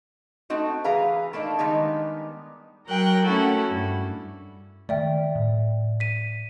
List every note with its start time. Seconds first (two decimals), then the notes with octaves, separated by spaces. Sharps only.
0.50 A3 C4 D#4 F#4
0.84 E3 G#4 B4 F5 A#5
1.33 A3 A#3 D4 D#4
1.59 D#3 G3 G#3 B3 D#4
2.88 F#3 A#4 G5 F#6
3.25 A3 C#4 E4 F#4 A4
3.70 G2
4.89 D#3 A3 D5 E5 G5
5.35 A2
6.00 B6 D#7